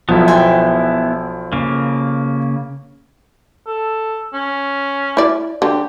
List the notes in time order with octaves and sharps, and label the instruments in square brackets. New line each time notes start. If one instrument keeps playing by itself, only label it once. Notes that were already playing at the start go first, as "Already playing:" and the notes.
[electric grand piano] B1 F3 [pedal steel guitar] B3 E4
[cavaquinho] C5 G5 G#5
[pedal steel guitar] C#3 A#3
[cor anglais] A4
C#4
[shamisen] E4 D5
[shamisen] D3 [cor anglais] G4